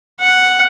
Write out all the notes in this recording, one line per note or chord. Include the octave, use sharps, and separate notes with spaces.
F#5